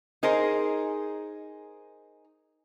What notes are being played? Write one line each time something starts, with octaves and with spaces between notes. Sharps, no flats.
D#4 G#4 A#4 C5